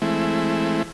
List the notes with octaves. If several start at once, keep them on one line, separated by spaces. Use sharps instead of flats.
E3 G#3 A3 C4 E4